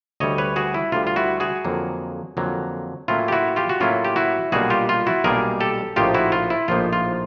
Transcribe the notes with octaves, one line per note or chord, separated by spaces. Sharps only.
D2 D3 G3 C#5 D#5
B4 C#5
F#4 G#4
E4
D2 D3 G3 F4
F4
E4 F#4
F#4 G#4
F2 D3 F#3 A#3
F2 D3 F#3 A#3
A2 F#3 A#3 C#4 E4 F4
G4
E4 F#4
F4 G4
F#4
A2 F#3 A#3 C#4 E4 F4
G4
E4 F#4
B1 A#2 G3 A#3 D4 F#4 G#4
F4 G4
F4
E4 F#4
B1 A#2 G3 A#3 D4 G#4 A#4
G4 A4
A#1 A2 F3 A#3 D#4 F4 G4
E4 F#4
F4
E4
A#1 A2 F3 A#3 D#4 F4
F4